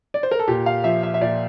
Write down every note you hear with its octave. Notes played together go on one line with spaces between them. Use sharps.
D5
C5
A#4
A4
A#2 G4
F5
F3 E5
E5
E5
A#2 D5